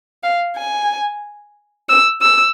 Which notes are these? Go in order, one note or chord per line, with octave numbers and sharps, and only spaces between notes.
F5
G#5
E6
E6